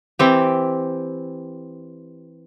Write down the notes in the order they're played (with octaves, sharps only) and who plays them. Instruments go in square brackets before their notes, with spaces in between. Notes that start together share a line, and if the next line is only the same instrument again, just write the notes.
[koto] E3 C4 G4